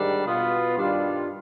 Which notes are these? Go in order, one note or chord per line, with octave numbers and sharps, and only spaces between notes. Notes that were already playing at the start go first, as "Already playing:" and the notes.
Already playing: G#2 D#3 G3 D4
B2 B3 F4
G2 D#3 G3 D4 F4